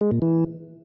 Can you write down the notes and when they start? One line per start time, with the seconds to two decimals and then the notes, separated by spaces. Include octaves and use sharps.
0.01 G#3
0.11 A#2
0.22 E3